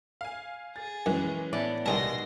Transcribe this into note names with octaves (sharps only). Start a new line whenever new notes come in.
F5 G#5
G#4 A6
F#2 E3 G#3 C#4
A2 B3 D5 F#5
F1 C2 B2 D#3 G#4 A5 C6 A#6